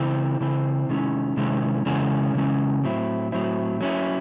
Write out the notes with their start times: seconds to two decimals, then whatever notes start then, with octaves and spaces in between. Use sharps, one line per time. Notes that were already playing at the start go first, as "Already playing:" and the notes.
Already playing: C#3 E3 C4 E4
0.41 C#3 E3 C4 E4
0.89 C3 D#3 G#3 C#4 E4
1.37 C3 D#3 G#3 C#4 E4
1.86 C#3 E3 G#3 C#4 E4
2.34 C#3 E3 G#3 C#4 E4
2.83 A2 F#3 C4 E4
3.32 A2 F#3 C4 E4
3.81 F#3 C#4 E4